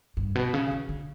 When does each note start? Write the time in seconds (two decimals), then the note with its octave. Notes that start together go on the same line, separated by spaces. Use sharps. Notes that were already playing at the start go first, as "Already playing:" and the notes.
0.17 G2
0.35 B2
0.54 C#3
0.71 E3
0.89 D3